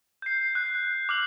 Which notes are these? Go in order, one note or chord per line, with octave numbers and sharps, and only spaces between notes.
G6 C7
F#6
D6 F6 F#7